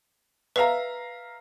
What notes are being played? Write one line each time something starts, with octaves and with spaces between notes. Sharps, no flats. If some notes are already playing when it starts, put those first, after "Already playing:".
B4 E5 F5 A#5